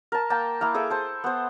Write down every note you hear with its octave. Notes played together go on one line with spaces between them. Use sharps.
A#4 A5
A#3 A#4 G5 A5
A#3 E4 F5
G#4 A4 E5 D6
C5 A5
B3 C5